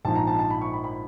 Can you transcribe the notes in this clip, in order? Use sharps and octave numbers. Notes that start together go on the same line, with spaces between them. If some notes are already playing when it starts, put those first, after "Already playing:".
A#1 G#2 F3 A5
A#5
A5
A5
B5
C#6
B5
B5